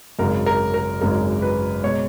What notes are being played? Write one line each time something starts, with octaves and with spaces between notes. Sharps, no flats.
G#1 F#2 C#3 G#3 A#4
A#4
A#4
G#1 F#2 C#3 G#3 A#4
B4
B2 G#3 C#5